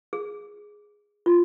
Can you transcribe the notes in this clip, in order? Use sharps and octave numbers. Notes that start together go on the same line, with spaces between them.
G#4
F4